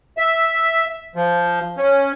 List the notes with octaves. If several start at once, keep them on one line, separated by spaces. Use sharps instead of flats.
E5
F3
C#4